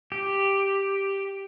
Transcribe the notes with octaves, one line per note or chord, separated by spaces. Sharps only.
G4